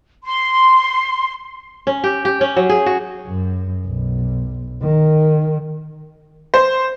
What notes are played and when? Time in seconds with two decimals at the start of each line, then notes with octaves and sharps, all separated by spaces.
0.25 C6
1.87 C#4
2.04 G4
2.25 G4
2.41 C#4
2.56 F#3
2.69 G#4
2.86 F#4
3.28 F#2
3.87 B1
4.82 D#3
6.54 C5